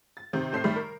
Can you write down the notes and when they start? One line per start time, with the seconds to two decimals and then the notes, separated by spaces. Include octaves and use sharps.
0.17 A6
0.33 C3 D#3 C4
0.52 A2 C4 A4 C5 G6 C7
0.64 D#3 G3 A3
0.76 A#4